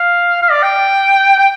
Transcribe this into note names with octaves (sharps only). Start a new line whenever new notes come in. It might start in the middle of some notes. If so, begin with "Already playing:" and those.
Already playing: F5
F5
D5
G5
G5